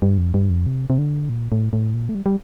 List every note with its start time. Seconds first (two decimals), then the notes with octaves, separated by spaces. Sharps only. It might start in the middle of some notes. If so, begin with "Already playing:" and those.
0.02 G2
0.18 F2
0.34 G2
0.50 F2
0.67 C3
0.90 C3
0.98 D3
1.29 A#2
1.52 A2
1.73 A2
1.94 A#2
2.09 A3
2.15 G3
2.26 G3